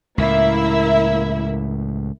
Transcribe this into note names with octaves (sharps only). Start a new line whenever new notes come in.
C#2 A2 A#3 E4 E5